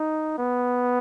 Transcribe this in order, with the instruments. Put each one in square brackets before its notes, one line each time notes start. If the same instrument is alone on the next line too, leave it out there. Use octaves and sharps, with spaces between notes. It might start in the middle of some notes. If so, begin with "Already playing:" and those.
Already playing: [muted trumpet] D#4
B3